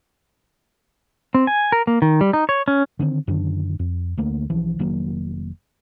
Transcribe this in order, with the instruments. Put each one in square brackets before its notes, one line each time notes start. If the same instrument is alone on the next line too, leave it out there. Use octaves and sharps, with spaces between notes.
[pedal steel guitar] C4
G#5
A#4
A#3
D#3
G3
D#4
C#5
C#4
[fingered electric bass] D3 D#3 G3 C4
F#2 D3 D#3 D4
F2
D2 A3 A#3
B1 E3 F3
F1 D#3 F#3 A#3